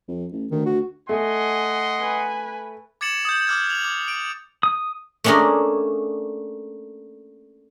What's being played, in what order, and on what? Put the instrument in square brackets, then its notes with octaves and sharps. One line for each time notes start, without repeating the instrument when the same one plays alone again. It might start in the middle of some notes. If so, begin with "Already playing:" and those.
[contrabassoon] F2
A1
[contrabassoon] D2 [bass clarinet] D#3
[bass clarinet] F#4
[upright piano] A3 [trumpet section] D#5 F#5 C6 [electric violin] G#5
[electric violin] B4 G#5
[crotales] D6 G#6 A6 C#7 E7 F#7
D#6 G6
D6 F6 G#6
F7
D6
D7
[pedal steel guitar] D#6
[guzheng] A3 A#3 C#4 D4 G#4 D#5